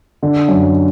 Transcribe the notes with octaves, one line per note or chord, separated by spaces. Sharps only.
D3
F#2